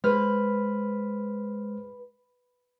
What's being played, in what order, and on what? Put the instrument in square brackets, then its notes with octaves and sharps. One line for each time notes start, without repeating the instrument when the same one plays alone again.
[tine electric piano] G#3 C5 F6 [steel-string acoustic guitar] B4